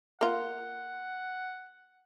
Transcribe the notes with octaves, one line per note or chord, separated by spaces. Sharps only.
A#3 F4 F#5